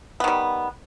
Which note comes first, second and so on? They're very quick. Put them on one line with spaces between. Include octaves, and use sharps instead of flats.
B3 D#3 G3